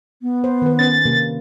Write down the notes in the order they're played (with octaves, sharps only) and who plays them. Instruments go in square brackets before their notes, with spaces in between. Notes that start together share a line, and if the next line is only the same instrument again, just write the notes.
[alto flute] B3
[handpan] C5
D#3 B4
[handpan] C#4 [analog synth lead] A6
[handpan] C3 A#3